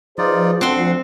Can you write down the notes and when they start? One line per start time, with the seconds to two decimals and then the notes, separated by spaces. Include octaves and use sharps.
0.18 F3 D#4 F4 G#4 B4 C5 D5
0.61 D2 C4 F#5 C6